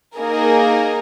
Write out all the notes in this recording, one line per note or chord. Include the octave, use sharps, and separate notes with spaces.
A#3 D#4 G#4 A#4